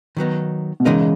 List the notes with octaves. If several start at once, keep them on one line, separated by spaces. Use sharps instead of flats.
D#3 F#3 B3 D#4
B2
C#3 E3 G#3 D#4 A#4 D#5